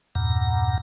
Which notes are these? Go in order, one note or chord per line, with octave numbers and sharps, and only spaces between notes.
E2 G2 A#2 F#5 A#5